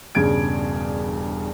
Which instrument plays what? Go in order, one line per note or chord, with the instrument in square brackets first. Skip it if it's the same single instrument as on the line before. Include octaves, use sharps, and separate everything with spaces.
[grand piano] E1 G2 C#3 G#6 D7